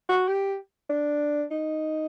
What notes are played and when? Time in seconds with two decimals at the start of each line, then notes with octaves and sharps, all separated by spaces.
0.09 F#4
0.28 G4
0.90 D4
1.51 D#4